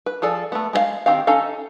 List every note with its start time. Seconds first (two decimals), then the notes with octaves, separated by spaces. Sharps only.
0.06 B4
0.22 F3 G#4 A4 D5
0.52 A3 B3
0.73 G#3 A#4 F5
1.06 D#3 C4 G4 F5
1.27 C#4 D#4 A4 F5